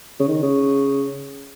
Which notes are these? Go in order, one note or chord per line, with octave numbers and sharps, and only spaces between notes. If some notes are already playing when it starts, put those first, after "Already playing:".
C#3
D#3
C#3